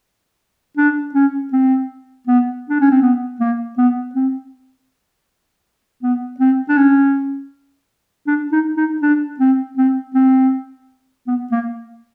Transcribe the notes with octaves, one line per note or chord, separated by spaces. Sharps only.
D4
C#4
C4
B3
D4
C#4
C4
B3
A#3
B3
C4
B3
C4
D4
C#4
D4
D#4
D#4
D4
C4
C4
C4
B3
A#3